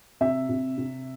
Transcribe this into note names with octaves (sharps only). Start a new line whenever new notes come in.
C3 E5
C3
C3